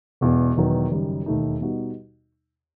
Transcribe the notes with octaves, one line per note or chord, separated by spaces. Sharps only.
E1 E2 B2
E1 E2 D#3 F#3 B3
F#1 F#2 D#3 G3
E1 D#2 D#3 A3 D#4
B2 G3 D#4 F#4